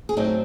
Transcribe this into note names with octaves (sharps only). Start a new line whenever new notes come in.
G#4
A2 F#3 C4 D#4 F#4